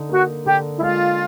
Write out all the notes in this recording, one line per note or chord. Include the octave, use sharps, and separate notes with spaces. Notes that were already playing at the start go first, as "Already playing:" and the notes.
Already playing: D3 D#4
A#3 F#4
D3 G4
E4
G#3 F4